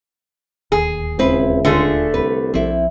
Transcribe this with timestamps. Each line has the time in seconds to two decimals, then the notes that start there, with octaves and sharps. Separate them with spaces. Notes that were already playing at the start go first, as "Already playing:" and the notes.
0.72 D1 D#2 D#3 G#4
1.19 C#2 C4 E4 B4
1.65 D3 A3 F4 G#4
2.14 C2 B4
2.54 A#1 F3 C4 E4